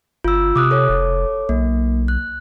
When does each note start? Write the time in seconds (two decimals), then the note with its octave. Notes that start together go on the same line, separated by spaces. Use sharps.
0.24 G1 F4 E6
0.56 C3 D6 D#6 F#6
0.71 A4 C#5 D6
0.89 F1
1.49 B1 A#3
2.08 F#6